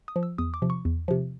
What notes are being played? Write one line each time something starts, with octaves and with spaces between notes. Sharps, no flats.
D#6
F3
E6
E2 D#6
D6
C3 F3
C#6
E2
C3 F3